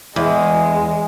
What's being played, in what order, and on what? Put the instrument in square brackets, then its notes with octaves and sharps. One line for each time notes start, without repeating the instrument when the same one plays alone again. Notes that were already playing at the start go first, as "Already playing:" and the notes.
[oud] E2 [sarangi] G#3